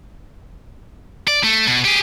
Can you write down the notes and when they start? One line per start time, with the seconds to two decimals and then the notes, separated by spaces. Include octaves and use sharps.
1.28 D5
1.44 A3
1.67 B2
1.85 G4 G#4